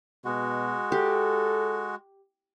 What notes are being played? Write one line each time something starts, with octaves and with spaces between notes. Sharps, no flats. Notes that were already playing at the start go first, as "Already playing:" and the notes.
B2 G#3 F#4
G4 A4